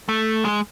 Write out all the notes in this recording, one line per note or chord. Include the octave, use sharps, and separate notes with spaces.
A3
G#3